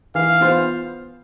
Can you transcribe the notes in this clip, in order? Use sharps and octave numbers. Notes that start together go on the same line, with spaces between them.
E3 F5
B3 F4 C5